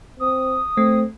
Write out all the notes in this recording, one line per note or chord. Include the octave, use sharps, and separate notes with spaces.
C4 D#6
A3 C4